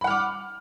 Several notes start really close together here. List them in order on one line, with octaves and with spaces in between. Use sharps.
B5 F#5 F6 D6